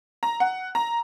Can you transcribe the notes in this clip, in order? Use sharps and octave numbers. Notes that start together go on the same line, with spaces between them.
A#5
F#5
A#5